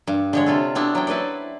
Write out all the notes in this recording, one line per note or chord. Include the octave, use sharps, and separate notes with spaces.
G2
D3 G#3 C#5
C3 F4 A4
B3 C4 D4 E4 F#4
F#3 C#4 G5
E4 B4 C5 D5